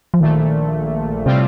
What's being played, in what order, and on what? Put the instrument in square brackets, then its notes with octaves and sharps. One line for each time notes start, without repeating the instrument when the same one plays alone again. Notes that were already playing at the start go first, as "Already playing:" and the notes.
[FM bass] F3
[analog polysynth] A#1 A#2 A3 [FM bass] D#3
[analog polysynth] A2 G3 C4 F4 [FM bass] C3